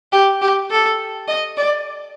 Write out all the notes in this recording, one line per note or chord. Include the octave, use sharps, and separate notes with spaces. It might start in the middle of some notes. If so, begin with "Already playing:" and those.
G4
G4
A4
D#5
D5